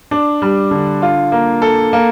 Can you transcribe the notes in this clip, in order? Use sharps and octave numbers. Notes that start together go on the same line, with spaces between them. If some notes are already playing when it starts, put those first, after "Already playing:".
D4
G3
D3
F4
A#3
A4
A#3